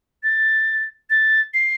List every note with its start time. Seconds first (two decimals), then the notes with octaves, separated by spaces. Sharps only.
0.23 A6
1.10 A6
1.54 C7